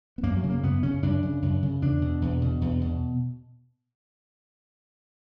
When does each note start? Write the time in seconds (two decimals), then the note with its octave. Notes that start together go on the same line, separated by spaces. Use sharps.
0.18 B3
0.23 F#2 A#3
0.37 F#3
0.43 C#3
0.50 A#3
0.63 F#2 B3
0.83 C#3 C#4
1.03 F#2 D4
1.23 C#3
1.42 F#2
1.63 C#3
1.82 E2 D4
2.02 B2
2.22 E2
2.42 B2
2.61 E2
2.81 B2